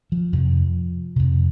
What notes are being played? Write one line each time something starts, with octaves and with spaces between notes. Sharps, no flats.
F3
F2 C3
F2 C3